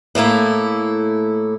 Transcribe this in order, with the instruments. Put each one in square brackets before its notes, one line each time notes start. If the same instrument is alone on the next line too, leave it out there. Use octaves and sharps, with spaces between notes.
[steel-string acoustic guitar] A2 A3 A#3 E4